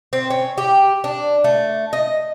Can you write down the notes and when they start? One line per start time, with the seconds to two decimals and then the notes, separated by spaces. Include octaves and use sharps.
0.13 C4
0.30 C#4
0.58 G4
1.04 D4
1.44 A3
1.93 D#5